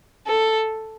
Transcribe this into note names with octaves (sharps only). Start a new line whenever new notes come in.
A4